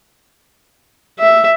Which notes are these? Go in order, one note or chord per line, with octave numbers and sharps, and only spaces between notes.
E5